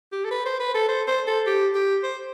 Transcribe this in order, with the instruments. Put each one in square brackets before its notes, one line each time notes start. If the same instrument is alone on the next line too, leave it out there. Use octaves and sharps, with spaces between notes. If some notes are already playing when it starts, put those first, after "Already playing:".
[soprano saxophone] G4
A4
B4
C5
B4
A4
C5
C5
A4
G4
G4
C5